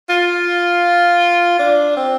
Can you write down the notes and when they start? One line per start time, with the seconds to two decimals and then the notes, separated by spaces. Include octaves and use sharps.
0.09 F4
1.59 D4
1.97 C4